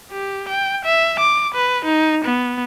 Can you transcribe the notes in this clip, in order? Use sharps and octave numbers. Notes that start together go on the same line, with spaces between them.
G4
G5
E5
D6
B4
D#4
B3